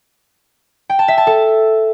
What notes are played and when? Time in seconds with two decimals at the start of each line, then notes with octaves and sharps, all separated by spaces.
0.90 G5
0.99 A5
1.08 E5
1.18 A5
1.27 A4